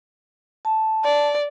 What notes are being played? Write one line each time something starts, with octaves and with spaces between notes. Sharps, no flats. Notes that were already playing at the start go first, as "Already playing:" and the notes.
A5
D5